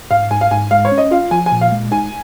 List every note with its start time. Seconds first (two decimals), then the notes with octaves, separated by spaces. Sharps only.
0.11 G#2 F5
0.31 G#2 G#5
0.41 F5
0.51 G#2 G#5
0.71 G#3 F5
0.85 C#5
0.92 C#4
0.98 D#5
1.11 F4 F5
1.31 F3 G#5
1.46 G#5
1.52 A#2
1.61 F5
1.72 G#3
1.91 D#4 G#5